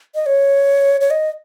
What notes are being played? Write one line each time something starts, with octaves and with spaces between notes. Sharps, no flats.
D#5
C#5
C#5
D#5